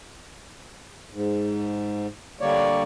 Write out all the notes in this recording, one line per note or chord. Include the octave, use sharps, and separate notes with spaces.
G#2
D3 G3 A#3 C#5 D5